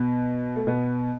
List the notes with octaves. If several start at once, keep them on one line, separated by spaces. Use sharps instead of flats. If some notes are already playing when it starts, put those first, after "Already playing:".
Already playing: B2 B3
A3
B2 B3